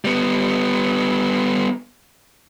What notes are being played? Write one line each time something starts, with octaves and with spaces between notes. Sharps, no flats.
G3 B3